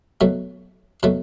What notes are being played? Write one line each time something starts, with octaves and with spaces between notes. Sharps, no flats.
B2 F#3 A3
B2 F#3 A3